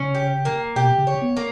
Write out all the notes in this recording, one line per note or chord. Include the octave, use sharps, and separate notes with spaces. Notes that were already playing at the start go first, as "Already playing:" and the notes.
Already playing: C#3 C#4
G4
A#3
B2 G4
C#3
C#5
B3
A#3